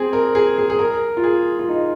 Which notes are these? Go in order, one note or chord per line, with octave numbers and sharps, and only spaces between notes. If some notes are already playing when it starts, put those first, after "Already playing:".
Already playing: C4 G#4
A#4
G#4
G#4
G#4
A#4
F4
G#4
F4
D#4